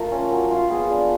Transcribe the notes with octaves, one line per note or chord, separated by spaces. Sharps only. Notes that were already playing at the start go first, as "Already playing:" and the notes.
Already playing: A3 F4 A#4
C#4
F#3
F4
B3 G#4
D4